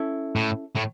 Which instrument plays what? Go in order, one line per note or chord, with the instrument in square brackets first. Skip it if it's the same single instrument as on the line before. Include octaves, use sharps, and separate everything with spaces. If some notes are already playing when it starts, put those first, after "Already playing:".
Already playing: [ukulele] C#4 E4 A4
[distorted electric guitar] A2
A2